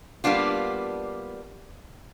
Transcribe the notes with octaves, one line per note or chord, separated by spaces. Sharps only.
G3 A#3 B3 D4 F4